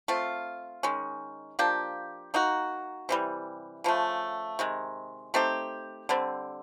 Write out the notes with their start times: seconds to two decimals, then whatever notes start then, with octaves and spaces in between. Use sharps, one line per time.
0.08 A3 C4 F4
0.83 D#3 G#3 C#4
1.59 F3 A#3 D4 G4
2.34 A#3 D#4 F#4
3.09 C3 E3 G3
3.84 C#3 F3 A3
4.59 C3 D#3 G#3
5.34 A3 C4 D#4 G4
6.09 D3 G3 C4